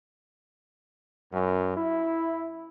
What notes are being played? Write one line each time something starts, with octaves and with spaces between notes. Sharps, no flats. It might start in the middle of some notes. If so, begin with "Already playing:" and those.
F#2
E4